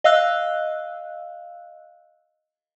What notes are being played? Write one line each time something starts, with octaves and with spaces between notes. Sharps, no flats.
D#5 F5 E6 F#6